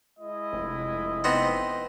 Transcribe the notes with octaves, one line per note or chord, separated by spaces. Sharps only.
G#3 E4 D#5
F1
B3 C4 D#4